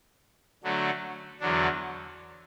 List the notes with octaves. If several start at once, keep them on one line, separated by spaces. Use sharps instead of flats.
D3 F#3 A3 D4
E2 D3 F#3 D4